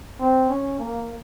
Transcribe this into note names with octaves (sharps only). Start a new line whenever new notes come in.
C4
C#4
A#3